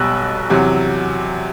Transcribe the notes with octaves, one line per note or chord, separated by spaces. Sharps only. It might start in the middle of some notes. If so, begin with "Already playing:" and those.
Already playing: B1 B2 G3 E6 F#6
E2 C3 F#3